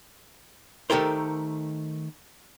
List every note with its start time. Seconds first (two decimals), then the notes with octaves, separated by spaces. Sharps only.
0.90 D#3 A3 G4 A4 A#4 C5